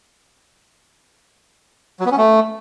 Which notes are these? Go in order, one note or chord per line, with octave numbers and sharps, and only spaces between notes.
F#3
B3
C#4
A3